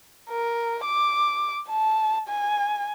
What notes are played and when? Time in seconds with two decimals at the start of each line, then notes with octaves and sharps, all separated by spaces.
0.30 A#4
0.85 D6
1.70 A5
2.28 G#5